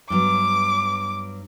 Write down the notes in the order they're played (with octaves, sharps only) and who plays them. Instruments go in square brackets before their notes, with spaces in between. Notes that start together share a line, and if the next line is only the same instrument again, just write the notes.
[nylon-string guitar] G2 F#3 B3 [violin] D6